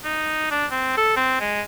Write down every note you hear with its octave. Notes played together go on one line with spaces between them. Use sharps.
D#4
D4
C4
A4
C4
G#3